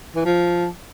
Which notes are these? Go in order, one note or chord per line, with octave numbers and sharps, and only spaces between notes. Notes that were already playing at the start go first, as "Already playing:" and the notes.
E3
F3